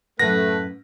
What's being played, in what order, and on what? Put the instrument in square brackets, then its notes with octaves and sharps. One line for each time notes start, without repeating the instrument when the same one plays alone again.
[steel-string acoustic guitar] F#2 A2 F#5 [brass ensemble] A3 [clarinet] B4 [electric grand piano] A#6